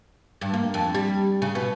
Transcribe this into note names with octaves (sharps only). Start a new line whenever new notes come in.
G2
A#3
F2
G3
C#3
B2